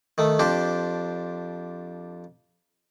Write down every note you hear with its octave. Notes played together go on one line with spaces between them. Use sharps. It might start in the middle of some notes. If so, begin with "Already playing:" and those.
D#3 A3
F2 D4 G4 C5